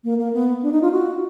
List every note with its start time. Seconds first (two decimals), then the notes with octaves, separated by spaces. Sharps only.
0.04 A#3
0.18 A#3
0.33 B3
0.63 D4
0.72 D#4
0.82 F4
0.92 F#4